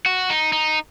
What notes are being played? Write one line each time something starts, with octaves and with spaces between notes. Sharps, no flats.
F#4
D#4
D#4